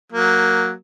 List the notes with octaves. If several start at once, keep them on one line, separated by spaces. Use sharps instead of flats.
F#3 A#3